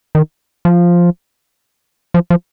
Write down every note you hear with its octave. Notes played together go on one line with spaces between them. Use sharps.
D#3
F3
F3
F3